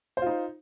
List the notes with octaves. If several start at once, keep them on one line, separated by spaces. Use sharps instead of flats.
D#4 F4 C5